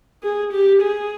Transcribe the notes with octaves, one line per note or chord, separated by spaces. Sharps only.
G#4
G4
G#4